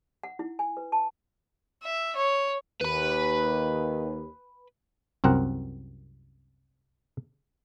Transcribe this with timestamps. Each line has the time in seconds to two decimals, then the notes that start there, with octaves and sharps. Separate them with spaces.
0.23 F#5
0.39 E4
0.59 G#5
0.77 B4
0.92 A5
1.83 E5
2.16 C#5
2.81 D#2 B4 B5
5.24 C2 F#2 C4 A#4 F#5